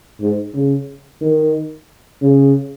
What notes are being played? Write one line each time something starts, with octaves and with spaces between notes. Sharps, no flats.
G#2
C#3
D#3
C#3